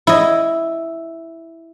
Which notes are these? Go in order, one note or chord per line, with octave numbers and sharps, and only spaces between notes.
E4 D#5